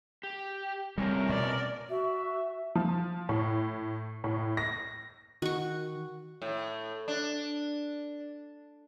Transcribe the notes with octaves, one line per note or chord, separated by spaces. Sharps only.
G4
A2 C3 G3 G#3 C4 C#4 A#4
B2 D5
F#4 E5
F3
A2
A2
A#6
D#3 F#4 C#6
A2
D4